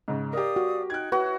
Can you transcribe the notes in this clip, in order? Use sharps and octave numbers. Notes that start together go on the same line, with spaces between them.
G#2 C#3
G4 A#4 D5 F5 D#6
F#4
D#4 G5 F#6 G#6
E4 F#4 B4 C#5